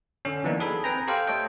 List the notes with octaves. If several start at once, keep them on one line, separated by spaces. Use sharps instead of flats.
D3 C#4
E3 F#3 A#3 B3 D4 D#4
G#4 A4 G#5 B5
C4 B4 G5 G#5 A#5
G4 A4 C5 F5 G5
A3 A4 C#5 D#5 G5